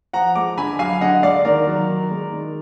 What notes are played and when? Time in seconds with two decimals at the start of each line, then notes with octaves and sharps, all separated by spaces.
0.13 F3 F#5 A#5
0.35 G#3 A#5 D6
0.57 D3 G#5 B5
0.79 F#3 F5 G#5
1.01 D3 D#5 F#5
1.23 G#3 D5 F5
1.45 D#3 A#4 D5
1.67 F#3
1.89 D#3
2.11 G#3
2.32 D#3